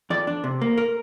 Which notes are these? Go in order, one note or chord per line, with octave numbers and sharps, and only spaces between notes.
F2 D5
D4
C3
A#3
A#4